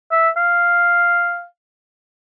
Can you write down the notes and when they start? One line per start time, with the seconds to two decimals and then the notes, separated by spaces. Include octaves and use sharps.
0.11 E5
0.37 F5